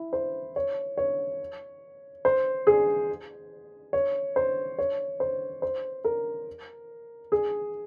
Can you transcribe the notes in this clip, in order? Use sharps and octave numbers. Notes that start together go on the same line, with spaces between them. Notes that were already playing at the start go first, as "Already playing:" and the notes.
Already playing: E4
C5
C#5
C#5
C5
G#4
C#5
C5
C#5
C5
C5
A#4
G#4